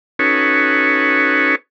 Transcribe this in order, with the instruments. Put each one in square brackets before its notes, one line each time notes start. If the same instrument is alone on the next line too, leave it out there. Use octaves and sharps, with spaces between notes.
[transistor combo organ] C#4 D#4 F#4 A4 B4 C#5